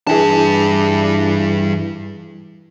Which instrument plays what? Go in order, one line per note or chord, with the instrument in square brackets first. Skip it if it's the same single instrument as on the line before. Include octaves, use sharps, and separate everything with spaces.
[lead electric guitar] G2 A5 [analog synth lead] E3 [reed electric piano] D4 E4 G#4